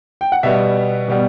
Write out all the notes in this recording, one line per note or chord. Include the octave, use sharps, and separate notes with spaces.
G5
F#5
B2 G3 B3 E5
B2 G3 B3